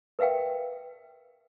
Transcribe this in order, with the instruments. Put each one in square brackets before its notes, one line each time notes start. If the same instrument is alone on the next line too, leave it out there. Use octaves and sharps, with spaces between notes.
[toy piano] A#4 B4 E5 F5 G5